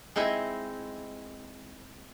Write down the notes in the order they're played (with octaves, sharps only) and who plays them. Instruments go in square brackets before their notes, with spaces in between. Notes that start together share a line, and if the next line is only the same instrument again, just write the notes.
[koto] G#3 C4 D#4 E4